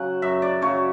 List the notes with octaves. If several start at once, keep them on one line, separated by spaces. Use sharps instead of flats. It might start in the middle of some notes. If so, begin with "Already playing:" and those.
Already playing: C#3 F#3 F#5
F#2 E5
D5
C#3 F#3 C#5